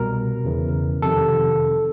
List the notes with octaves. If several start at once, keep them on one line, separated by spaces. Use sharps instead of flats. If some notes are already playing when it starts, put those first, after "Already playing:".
Already playing: C2 B2 G3 A#4
E2 C#3 E3
F2 C3 D#3 A4